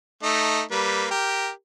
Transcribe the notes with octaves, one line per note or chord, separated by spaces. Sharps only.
A3 D#4
G3 A#3 B4
G4 A#4